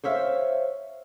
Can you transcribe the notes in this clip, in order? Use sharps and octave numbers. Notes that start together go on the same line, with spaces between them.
C5 C#5 E5 F5